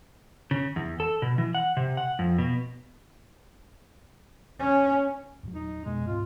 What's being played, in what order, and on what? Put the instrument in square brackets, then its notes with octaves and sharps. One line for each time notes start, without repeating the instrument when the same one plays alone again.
[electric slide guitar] C#3
E2
A4
B2
E3
F#5
C3
F#5
F2
B2
[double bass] C#4
[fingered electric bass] E2 A#2 F#3
[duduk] D#4
[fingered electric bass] F2 B2 B3 [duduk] G#3
[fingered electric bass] D1 G#2 C4 [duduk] F4